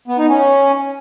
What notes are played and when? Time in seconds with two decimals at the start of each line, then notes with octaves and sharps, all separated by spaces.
0.08 B3
0.18 D#4
0.29 C#4